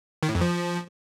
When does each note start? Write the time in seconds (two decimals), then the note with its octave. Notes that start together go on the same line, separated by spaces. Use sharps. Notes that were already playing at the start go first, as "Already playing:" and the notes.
0.23 D#3
0.29 A2
0.35 F2
0.41 F3